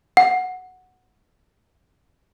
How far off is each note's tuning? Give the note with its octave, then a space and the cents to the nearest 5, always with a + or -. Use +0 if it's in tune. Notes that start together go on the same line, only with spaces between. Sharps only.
F#5 -5